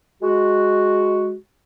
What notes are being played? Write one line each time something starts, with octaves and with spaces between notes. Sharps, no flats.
G#3 F#4